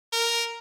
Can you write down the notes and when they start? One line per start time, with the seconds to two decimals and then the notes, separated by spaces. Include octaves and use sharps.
0.12 A#4